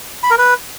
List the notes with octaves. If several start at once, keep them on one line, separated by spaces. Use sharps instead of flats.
B5
A#4
B4